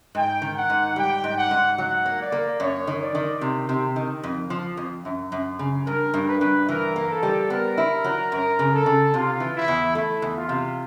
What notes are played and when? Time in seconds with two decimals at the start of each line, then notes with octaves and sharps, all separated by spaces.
0.15 G#2 G5
0.42 D#3
0.56 F#5
0.70 G#2
0.96 G3 G5
1.24 G#2
1.37 F#5
1.51 G#2
1.78 F#3 F#5
2.06 A#3
2.20 D5
2.32 A#3
2.59 F#2 C#5
2.87 D#3
3.01 D5
3.15 D#3
3.41 C3
3.69 C3
3.96 D#3
4.24 F2
4.50 F3
4.77 F2
5.05 F#2
5.32 F#2
5.59 C#3
5.86 G2 A#4
6.14 G2
6.28 B4
6.41 G2
6.69 E3 A#4
6.96 A#3
7.09 A4
7.23 G3
7.50 B3 A#4
7.78 E4
8.04 F#3
8.32 F#2 A#4
8.59 C#3
8.72 A4
8.86 C#3
9.13 C3 F4
9.40 E3
9.54 E4
9.68 E2
9.95 A3 E4
10.22 E2
10.36 F4
10.49 C3